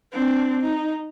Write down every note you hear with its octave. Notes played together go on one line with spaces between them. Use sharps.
C4 D4
D#4